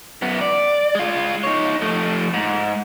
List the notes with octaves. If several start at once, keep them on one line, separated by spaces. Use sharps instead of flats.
F#2 B3
D5
G#3 F4
D#4 C#5
F3 A3
G#2